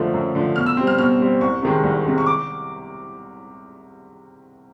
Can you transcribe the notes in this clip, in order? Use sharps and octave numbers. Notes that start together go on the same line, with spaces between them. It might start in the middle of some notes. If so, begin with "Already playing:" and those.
Already playing: F#2 D3 F3 A3
F#2
D3 F3 A3
B2 F6
E6
G3 C4
F6
B2 F6
G3 C4
C2 C#6
C3 D#3 G#3
C2
C3 D#3 G#3
C#6
D6